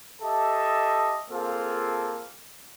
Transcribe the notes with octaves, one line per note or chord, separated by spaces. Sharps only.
G4 A4 D#5 E5 A5
A#3 C4 F4 G#4 A4